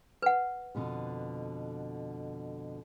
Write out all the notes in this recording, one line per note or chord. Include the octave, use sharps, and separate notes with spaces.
B4 F#5
F2 B2 D3